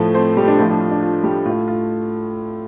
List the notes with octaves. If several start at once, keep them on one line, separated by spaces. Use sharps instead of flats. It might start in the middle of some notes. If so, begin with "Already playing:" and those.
Already playing: A2 F3 A3 C4
C4 C5
G3 G4
D4
A2 F3 A3 F4
D4
F4
D4
F4
G3 G4
A2 A3 F4
F4